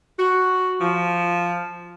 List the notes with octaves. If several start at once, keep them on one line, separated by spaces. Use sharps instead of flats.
F#4
F3